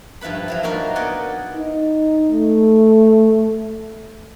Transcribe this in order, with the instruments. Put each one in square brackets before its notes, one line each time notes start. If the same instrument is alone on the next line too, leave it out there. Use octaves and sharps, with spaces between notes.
[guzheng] G2 F3 E4 B4 B5
F3 F#3 E5
A#3 D#4 F#4 A#4 B4
B3 D5 D#5 F#5 G#5
[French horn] D#4
A3